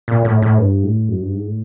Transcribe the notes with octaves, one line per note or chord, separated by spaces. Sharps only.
A#2
A2
A2
G2
A2
F#2
G2
G#2
A2